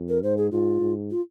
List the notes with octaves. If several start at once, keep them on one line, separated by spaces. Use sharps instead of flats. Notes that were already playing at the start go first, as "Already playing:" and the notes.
Already playing: F2
A#4
G#2 C5
G#4
G#2 F4
G#2
F4